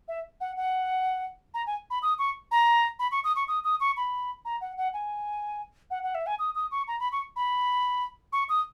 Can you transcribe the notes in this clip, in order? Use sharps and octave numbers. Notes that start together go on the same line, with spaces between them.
E5
F#5
F#5
A#5
G#5
B5
D#6
C#6
A#5
B5
C#6
D#6
C#6
D#6
D#6
C#6
B5
A#5
F#5
F#5
G#5
F#5
F#5
E5
G#5
D#6
D#6
C#6
A#5
B5
C#6
B5
C#6
D#6